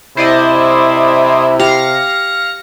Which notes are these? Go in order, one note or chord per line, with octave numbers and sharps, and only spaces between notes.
C3 E4 C5 D5 D#5
G4 F5 A#6 C#7